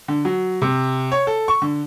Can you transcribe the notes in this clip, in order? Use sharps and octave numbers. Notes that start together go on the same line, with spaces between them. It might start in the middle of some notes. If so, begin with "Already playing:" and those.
D3
F#3
C3
C#5
A4
C#6
D3